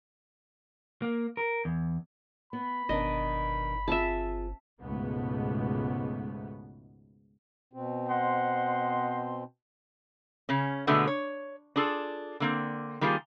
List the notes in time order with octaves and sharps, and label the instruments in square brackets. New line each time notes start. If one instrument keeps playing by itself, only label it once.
[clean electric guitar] A#3
A#4
E2
[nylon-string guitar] B3 [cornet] B5
[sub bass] G1 [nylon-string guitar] B2 D#3 D4 [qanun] D#5
[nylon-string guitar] C4 F4 G#4 [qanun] E5 A5
[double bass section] C#2 G#2 B2 A3 B3
[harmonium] B2 C4
[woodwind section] C5 D#5 C6 [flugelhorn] F#5
[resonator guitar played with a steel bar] C#3 C#4
B2 D3 G#3 A3 B3
C#5
D4 F4 G#4 A4
D3 A#3 C4
D#3 G3 A#3 F4 G#4